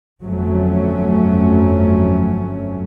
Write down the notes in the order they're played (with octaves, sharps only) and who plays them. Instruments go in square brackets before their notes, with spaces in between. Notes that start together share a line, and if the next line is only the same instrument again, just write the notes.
[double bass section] G1 F2 F#3 A3 C#4